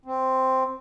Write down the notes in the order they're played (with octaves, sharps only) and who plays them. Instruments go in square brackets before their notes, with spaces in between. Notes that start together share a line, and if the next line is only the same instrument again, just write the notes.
[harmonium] C4